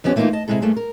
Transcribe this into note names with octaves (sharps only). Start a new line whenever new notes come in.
F2 F3 B3 C#4 G4
E3 A3 A#3 C4 D#4 F4
D#5 A5
C3 F#3 G#3 E4 A4
G2 A3 A#3 G#4
A#4